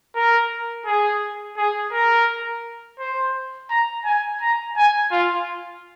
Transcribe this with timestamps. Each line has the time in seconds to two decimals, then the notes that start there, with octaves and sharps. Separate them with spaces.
0.16 A#4
0.86 G#4
1.58 G#4
1.93 A#4
2.99 C5
3.70 A#5
4.05 G#5
4.41 A#5
4.77 G#5
5.11 F4